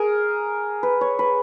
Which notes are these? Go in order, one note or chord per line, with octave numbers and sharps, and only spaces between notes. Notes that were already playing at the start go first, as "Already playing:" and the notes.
Already playing: G#4 A#4
B4
C#5
B4